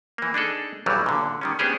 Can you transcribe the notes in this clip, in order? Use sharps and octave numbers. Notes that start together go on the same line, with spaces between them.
E3 A#3
D4 D#4 G#4 A4
B1 E3 F#3 G3
A#2 D3
D#3 G3 C#4
B3 C#4 D4 G4 G#4 C5